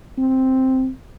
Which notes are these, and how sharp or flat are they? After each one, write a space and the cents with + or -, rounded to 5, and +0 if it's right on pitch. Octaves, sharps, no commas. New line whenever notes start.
C4 +0